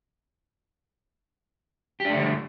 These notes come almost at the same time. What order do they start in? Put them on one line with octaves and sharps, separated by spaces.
G4 D4 A3 D3 G3